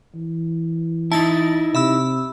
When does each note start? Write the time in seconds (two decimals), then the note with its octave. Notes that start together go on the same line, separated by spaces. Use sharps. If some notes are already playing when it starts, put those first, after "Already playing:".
0.15 E3
1.12 D#4 E4 A5 A6
1.75 C3 E5 B5 E6